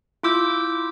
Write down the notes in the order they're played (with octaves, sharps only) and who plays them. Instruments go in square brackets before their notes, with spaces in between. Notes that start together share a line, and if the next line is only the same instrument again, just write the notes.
[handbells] E4 F4 D6 E6 G6